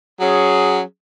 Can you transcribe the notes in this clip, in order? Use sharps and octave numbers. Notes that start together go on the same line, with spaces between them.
F#3 C#4 G#4